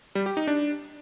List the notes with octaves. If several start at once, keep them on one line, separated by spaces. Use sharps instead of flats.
G3
G4
D#4
D4